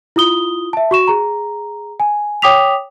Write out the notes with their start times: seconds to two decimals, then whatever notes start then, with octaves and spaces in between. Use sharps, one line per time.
0.16 E4 F4 D#6 G7
0.73 E5 A5
0.91 F#4 C#6 E7
1.08 G#4 A#5
2.00 G#5
2.42 C#5 G5 D6 D#6 B6 F7